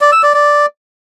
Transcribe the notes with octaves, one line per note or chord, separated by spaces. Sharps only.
D5
E6
D5
D5